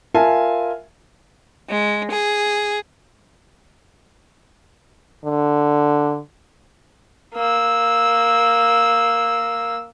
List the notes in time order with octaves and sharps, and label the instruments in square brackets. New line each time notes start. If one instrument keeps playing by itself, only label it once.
[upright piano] F4 A#4 E5 F5 G#5 A5
[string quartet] G#3
G#4
[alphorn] D3
[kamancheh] A#3 E6